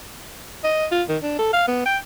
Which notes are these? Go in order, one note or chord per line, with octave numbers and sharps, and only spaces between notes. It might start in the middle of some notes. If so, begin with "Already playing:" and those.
D#5
F4
D#3
D4
A4
F5
B3
G5